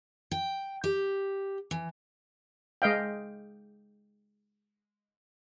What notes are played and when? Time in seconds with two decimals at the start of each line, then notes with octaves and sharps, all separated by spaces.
0.31 G5
0.84 G4
1.71 E3
2.82 G#3 D#5 F5 G5